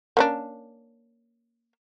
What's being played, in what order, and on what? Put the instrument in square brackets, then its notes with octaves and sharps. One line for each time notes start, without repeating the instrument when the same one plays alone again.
[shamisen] A#3 C#4 D4